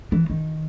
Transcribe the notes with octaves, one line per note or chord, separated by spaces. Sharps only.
E3
D#3